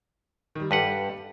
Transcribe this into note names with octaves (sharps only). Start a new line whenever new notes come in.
D#3 G3
G2 G3 G4 A4 B4 F#5